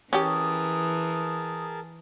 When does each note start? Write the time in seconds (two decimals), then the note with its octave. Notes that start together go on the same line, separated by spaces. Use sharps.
0.13 E3 C#4 G4 G#4 A#4 A5 D#6